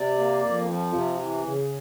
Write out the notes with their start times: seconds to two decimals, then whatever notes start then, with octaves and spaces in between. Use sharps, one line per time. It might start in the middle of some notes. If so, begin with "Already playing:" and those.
Already playing: C3 D5
0.18 A#3
0.43 F2
0.68 F3
0.94 C3
1.19 E3
1.45 C#3